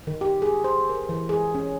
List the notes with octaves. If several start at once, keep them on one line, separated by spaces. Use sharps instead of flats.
D#3
G4
G#4
C5
A#4
E3
G#4
C#4